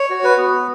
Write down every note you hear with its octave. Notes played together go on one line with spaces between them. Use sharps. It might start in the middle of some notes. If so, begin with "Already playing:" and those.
Already playing: C#5
F#4
B4
B3